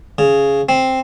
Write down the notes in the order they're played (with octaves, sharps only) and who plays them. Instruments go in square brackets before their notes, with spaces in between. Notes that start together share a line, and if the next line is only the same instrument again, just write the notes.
[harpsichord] C#3
C4